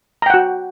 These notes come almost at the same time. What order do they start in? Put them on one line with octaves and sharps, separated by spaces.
A#5 G5 F#5 F#4